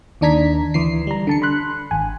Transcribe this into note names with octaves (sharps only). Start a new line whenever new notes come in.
D#2 D#3 D4 A#5 G#6 B6
D2 E3 C7
G3 A#5
D3 A5 C#7
B5 C6 F#6
G#1 G#5